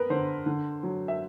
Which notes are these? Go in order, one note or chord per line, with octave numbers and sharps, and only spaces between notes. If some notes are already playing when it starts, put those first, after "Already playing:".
Already playing: B3 A#4 B4
D3 C5
D3
F#3
E5